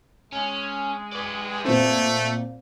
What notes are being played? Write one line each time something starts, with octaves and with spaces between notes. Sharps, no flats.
G#3 C#4
B4 D5
A#2 A3 C4